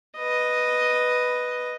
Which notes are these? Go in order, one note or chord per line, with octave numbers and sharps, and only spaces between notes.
B4 D#5